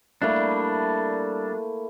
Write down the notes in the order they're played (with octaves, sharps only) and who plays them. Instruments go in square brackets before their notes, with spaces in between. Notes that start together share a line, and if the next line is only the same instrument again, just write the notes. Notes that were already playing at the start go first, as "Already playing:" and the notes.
[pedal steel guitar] G3 D4 [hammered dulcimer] A3 A#3 E4